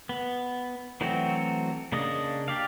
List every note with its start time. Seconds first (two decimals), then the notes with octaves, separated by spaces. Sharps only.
0.09 B3
1.01 E3 F#3 A3 C4 F#4
1.92 C#3 A#3 D4 D#5
2.48 G4 D5 F5